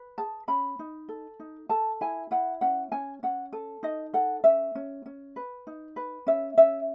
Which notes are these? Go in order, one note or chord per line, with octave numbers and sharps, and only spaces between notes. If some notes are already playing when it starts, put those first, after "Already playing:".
Already playing: B4
G#4 A5
C#4 B5
D#4
A4
D#4
A4 A5
E4 G#5
E4 F#5
C#4 F#5
C#4 G#5
C#4 F#5
A4
D#4 D#5
A4 F#5
C#4 E5
C#4
C#4
B4
D#4
B4
C#4 E5
C#4 E5